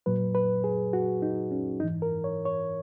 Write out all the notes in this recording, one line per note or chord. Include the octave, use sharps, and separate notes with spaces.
A#2 F#3 B4
B4
G#4
F#4
D#4
C#4
G#2 E3 D#4
A#4
C#5
C#5